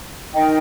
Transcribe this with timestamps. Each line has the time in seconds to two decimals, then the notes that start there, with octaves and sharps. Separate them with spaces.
0.33 D#4 A#4 D#5 G5